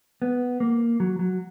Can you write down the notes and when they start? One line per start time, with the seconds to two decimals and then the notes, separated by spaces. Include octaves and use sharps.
0.22 B3
0.60 A#3
1.00 F#3
1.19 F#3